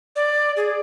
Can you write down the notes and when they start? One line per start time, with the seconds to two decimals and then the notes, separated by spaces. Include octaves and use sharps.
0.16 D5
0.56 G#4